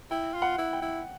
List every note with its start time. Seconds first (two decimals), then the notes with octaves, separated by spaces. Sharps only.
0.11 E4 G5
0.34 F4
0.42 F#5
0.58 E4
0.73 G5
0.82 E4